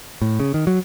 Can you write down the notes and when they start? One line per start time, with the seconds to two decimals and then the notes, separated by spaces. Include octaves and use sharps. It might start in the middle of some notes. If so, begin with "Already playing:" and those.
0.22 A2
0.40 C#3
0.54 D#3
0.67 F#3